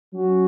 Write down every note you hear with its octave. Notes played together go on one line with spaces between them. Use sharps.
F#3 C#4 F#4